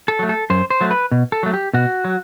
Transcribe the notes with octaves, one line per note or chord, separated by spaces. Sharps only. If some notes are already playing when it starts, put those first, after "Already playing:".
A4
F#3 A3
A4
F#2 C5
C5
F#3 A3
B4
B2
A4
F#3 A3
G4
B2 F#4
F#3